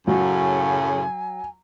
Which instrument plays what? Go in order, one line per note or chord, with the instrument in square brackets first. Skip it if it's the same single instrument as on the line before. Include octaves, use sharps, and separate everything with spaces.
[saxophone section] F#2 A2 C#3 [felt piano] F#3 [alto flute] G#5